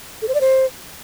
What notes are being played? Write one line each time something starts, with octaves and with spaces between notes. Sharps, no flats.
A4
C5
D5
C5